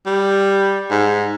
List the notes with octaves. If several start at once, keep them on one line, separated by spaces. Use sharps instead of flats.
G3
G#2